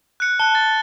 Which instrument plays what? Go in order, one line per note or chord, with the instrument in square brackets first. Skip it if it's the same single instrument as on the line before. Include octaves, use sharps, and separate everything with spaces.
[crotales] F#6 C#7
[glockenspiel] A5 [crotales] F#6 G7
[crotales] A6